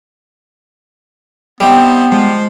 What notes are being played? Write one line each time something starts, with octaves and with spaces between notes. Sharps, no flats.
G3 B3 C4 D#4 E4
F3 G#3